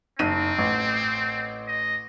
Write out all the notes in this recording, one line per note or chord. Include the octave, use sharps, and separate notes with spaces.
F#1 C4 D#4 D#7
A1
D#5